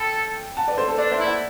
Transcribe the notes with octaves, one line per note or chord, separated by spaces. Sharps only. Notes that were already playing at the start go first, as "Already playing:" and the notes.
Already playing: A4 G5 B5
F#5 A5
B4 D5
A4 C5
A4 C5
D4 B4 D5
C5 E5
E4
D5 F#5